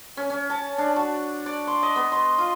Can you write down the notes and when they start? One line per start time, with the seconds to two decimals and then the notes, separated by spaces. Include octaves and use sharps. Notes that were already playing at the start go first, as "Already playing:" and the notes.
0.17 C#4
0.30 C#4
0.50 A5
0.78 D4
0.96 F#4
1.46 D5
1.67 C6
1.83 D#5
1.96 B3
2.12 C6
2.38 F4